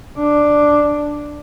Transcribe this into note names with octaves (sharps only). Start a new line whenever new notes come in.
D4